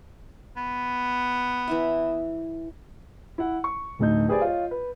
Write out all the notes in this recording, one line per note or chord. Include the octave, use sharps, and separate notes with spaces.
B3
E3 E4 E5
E4 F#5
C#6
D1 D2 A3 D#4 G6
G4 G#4 B4 C5 D5 G#5
F4 C#5 D#5
B4